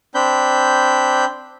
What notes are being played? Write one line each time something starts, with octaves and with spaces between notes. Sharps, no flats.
C4 D4 B5 G6